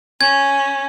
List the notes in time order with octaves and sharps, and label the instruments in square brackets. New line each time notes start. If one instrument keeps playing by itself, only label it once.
[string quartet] C#4 [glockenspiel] G#6